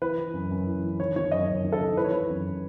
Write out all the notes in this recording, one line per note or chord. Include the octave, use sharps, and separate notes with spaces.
E3 B4
E3
F#2
F#2
E3
E3
D#3 C#5
D#3 C#5
F#2 D#5
F#2 C#5
D#3
A4
D#3
E3 B4
C#5
E3 B4
F#2